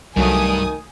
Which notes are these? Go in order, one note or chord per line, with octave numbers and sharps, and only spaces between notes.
C2 G2 D#3 F#3 A3 G#5 D#6